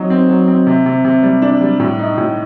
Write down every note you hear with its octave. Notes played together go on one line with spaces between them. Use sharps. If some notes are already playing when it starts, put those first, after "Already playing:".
Already playing: F#3 C4 D#4
C4
F#3
C4
C3
C3
C3
G3
D4
G3
A2
D#4
A2